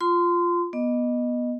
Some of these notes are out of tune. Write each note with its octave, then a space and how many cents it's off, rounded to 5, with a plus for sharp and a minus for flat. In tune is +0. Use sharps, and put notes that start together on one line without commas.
F4 +0 C6 -25
B3 -15 D#5 -10